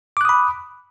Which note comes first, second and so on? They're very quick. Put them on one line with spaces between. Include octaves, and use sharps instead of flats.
D6 F#6 D#6 B5